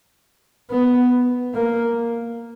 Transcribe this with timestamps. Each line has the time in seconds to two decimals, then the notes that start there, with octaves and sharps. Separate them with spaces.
0.71 B3
1.55 A#3